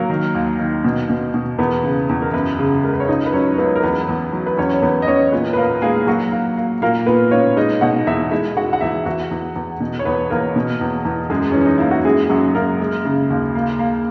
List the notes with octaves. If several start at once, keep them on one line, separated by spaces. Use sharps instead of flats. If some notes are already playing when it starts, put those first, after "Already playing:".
Already playing: F#3 A#3 A#4
D#3
D#2
D#3
B2
B2
B2
E2 B3 B4
C#3
E2
A#4
F#2 B3 B4
C#3
G#3 A#4
B4
C#5
C#2 D#4 D#5
B4
F#3 C#4 C#5
C#2 B3 B4
A#4
E2 B3 B4
E2
F#3
B4
E2 C#4 C#5
C#5
E2 B3 B4
D#5
E2 C#4 C#5
A#2 B3 B4
B4
A#3 A#4
G#3 A#3 G#4
F#3 A#3 F#4
A#3
A#3
A#2 A#3 A#4
A#2 B3 B4
A#3 C#4 C#5
G#3 D#4 D#5
B2 F#4 F#5
E2 E4 E5
G#3 E4 E5
G#3 F#4 F#5
F#5
E2 E4 E5
E2 F#4 F#5
E2
E2
B2
C#5
E2 B3 B4
E2 A#3 A#4
B2
E2
E2
F#2 G#3 G#4
E3 C#4
D#4
A#3 E4
F#4
F#2 G#3 G#4
F#2 F#3 F#4
F#2 A#3 A#4
G#3
C#3
D#2
A#3
A#3